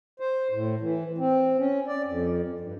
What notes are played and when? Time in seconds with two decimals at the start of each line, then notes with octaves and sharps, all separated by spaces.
0.20 C5
0.51 A2
0.81 E3
1.18 C4
1.58 C#4
1.87 D5
2.06 F2
2.60 G2